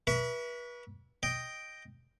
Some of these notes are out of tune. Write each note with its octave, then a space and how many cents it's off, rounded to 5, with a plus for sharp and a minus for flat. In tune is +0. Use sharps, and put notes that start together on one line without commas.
B4 -35 E5 +0 C#6 +35
D#5 +0 G5 +0